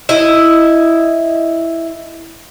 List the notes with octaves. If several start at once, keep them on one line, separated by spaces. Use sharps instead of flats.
E4 D#5